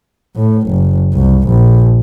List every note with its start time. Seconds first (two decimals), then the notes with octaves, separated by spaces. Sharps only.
0.37 A2
0.69 F#1
1.14 C2
1.48 A#1